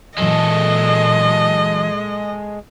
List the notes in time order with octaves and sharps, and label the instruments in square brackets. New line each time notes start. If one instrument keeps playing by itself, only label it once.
[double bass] A#2 [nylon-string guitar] E3 F#3 [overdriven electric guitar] G#3 A4 [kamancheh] D#5